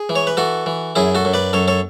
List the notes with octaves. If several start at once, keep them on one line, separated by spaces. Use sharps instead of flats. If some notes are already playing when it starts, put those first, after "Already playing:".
Already playing: G#4
E3
C#5
B4
E3 F#4 A4
E3
F#2 E4 G#4
F#4 A4
F#2
B4 D5
F#2 A4 C#5
A4 C#5